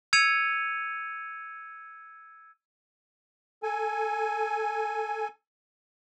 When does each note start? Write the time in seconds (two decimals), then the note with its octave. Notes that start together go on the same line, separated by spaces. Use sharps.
0.13 E6 G#6 C#7 D#7 F7
3.63 A4 G#5